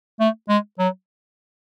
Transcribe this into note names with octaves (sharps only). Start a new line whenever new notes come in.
A3
G#3
F#3